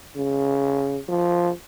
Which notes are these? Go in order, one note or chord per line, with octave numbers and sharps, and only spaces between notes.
C#3
F3